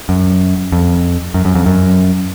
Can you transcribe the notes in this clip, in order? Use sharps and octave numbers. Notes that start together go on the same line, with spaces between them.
F#2
F2
F#2
F#2
F2
F#2